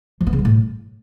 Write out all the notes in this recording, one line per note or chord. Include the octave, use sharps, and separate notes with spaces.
F3
B3
C#3
G3
A2